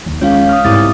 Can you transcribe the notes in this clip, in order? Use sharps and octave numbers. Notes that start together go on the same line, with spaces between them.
D#2 F#3
C#2 C#5 F5
D#6 F6
C2 G#2 A#3 D6 D#6 A6